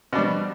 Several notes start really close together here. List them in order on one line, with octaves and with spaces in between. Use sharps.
B2 D4 G3